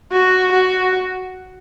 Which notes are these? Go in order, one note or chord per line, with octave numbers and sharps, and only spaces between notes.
F#4
F#4